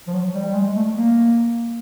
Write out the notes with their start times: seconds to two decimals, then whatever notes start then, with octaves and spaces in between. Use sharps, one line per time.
0.07 F3
0.14 F#3
0.34 G3
0.44 G3
0.54 G#3
0.76 A3
0.96 A#3